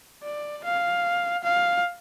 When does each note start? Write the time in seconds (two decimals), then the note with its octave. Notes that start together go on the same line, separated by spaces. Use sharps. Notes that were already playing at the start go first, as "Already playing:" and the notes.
0.23 D5
0.64 F5
1.44 F5